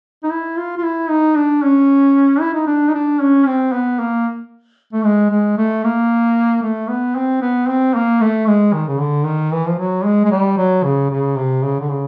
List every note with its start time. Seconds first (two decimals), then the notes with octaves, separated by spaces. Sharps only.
0.23 D#4
0.30 E4
0.57 F4
0.77 F4
0.83 E4
1.09 D#4
1.36 D4
1.63 C#4
2.40 E4
2.54 D#4
2.67 D4
2.88 D#4
2.94 D4
3.20 C#4
3.47 C4
3.72 B3
3.99 A#3
4.93 A3
5.05 G#3
5.30 G#3
5.58 A3
5.84 A#3
6.62 A3
6.88 B3
7.15 C4
7.41 B3
7.68 C4
7.95 A#3
8.21 A3
8.47 G#3
8.73 D#3
8.88 C#3
8.99 D3
9.25 D#3
9.52 E3
9.68 F3
9.78 F#3
10.05 G#3
10.25 G#3
10.31 G3
10.58 F#3
10.84 C#3
11.10 C#3
11.36 C3
11.63 C#3
11.80 D3
11.89 C#3